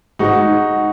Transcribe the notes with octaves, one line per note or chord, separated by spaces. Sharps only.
G#2 D#4 F#4